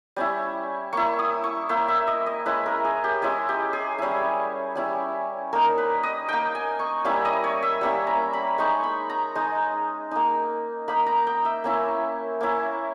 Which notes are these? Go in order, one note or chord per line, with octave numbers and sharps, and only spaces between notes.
G3 C#4 E4
A#3 E4 C#6
D#6
C#6
A#3 E4 G5
E5
D#5
D#5
G#3 C#4 E4 B4
A#4
G#4
G4
G#3 C#4 E4 G#4
G4
G#4
G3 C#4 E4
G3 C#4 E4
A#3 D#4 A#4
B4
D#5
A#3 D#4 G5
G#5
C#6
G3 A#3 C#4 E4 B5
D#5
C#5
E5
G3 A#3 C#4 E4
A#5
B5
G#3 D#4 C#6
B5
A#5
G#3 D#4
A#3 D#4
A#3 D#4 B5
A#5
G5
E5
A#3 C#4 E4
A#3 C#4 E4